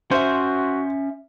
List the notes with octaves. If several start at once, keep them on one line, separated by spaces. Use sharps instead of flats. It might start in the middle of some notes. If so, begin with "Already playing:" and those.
C#4 F#4 C5 E5